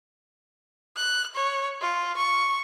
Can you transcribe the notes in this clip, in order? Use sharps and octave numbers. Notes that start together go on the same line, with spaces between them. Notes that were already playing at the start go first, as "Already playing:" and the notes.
F#6
C#5
F4
C#6